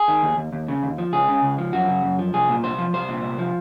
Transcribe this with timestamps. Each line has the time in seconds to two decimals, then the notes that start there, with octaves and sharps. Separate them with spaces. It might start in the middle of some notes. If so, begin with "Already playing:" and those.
Already playing: G#4
0.08 D#3
0.23 D#2
0.37 D#2
0.53 D#2
0.68 C#3
0.83 D#2
0.98 F3
1.13 C#2 G#4
1.28 C#3
1.43 C#2
1.58 F3
1.73 F#2 F#4
1.88 C#3
2.04 F#2
2.19 F3
2.34 C2 G#4
2.49 A#2
2.63 C2 C5
2.78 F3
2.93 C2 C5
3.08 A#2
3.23 C2
3.38 F3